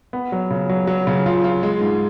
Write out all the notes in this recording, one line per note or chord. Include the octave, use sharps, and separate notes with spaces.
B3
F#3
C#3
F#3
F#3
C#3
F4
F4
G#3
G#2